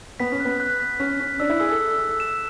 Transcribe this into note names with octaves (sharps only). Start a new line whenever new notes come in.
B3 B6
C#4
F#6
B3
F#6
B6
C#4 B6
C#4 B6
D4 E6
E4
G#4 E6
A4
E6
E6
E7